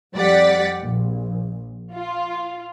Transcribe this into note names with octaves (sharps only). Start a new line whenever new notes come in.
F2 G3 D5 F#5 A6 B6
A#1
F4